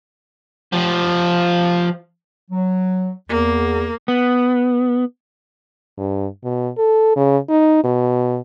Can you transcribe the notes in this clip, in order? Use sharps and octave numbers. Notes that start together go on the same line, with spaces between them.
F3 G4
F#3
E2 A#3
B3
G2
B2
A4
C#3
D#4
B2